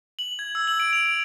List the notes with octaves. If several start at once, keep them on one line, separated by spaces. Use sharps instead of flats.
F#7
G#6
E6
F#7
D7
F7
D7